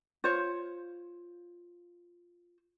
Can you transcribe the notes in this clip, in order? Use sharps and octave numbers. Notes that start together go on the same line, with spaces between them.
F4 C5 C#5